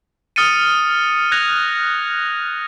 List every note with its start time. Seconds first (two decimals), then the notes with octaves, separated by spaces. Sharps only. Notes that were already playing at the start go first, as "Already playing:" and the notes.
0.36 D#6 F6 A6 C#7 D#7
1.32 F#6 G#6 A#6 F7